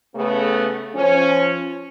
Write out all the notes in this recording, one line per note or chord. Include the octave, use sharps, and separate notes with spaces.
C#3 A3 B3
F3 C#4